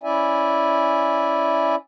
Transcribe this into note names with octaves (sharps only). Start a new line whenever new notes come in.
C#4 E4 D5 E5 G#5